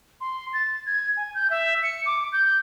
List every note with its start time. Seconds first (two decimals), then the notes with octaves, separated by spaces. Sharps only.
0.21 C6
0.53 A6
0.86 G#6
1.17 G#5
1.34 G6
1.50 E5
1.83 C#7
2.06 D6
2.32 G6